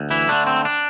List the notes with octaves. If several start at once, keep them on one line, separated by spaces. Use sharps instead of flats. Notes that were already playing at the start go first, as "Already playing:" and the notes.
Already playing: D2
E3 E4
D3 A3 D4
C4
D4